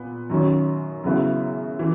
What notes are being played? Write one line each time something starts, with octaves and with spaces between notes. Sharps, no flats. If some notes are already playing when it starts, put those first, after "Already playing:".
Already playing: A#2 B3
F#2 D#3 F#3 C#4
F#2 C#3 F#3 B3 E4
E3